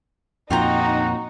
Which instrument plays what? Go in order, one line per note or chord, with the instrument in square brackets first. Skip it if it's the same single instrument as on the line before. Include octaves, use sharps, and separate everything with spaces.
[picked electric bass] F2 A#2 [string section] D#4 [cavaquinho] F4 G5 A#5 [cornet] F#4